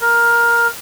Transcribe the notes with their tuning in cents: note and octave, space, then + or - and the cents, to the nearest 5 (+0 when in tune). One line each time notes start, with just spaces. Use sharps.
A#4 +10